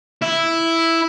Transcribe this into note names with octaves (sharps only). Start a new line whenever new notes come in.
E4